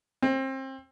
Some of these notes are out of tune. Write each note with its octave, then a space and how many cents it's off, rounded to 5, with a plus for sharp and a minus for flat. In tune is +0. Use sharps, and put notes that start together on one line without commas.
C4 +30